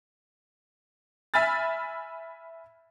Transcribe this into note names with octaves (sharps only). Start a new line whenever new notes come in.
E5 G#5 B5 F6 A6